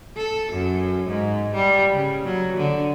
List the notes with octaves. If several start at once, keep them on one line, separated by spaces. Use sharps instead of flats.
A4
F#2
G#2
G3
C#3
F#3
D3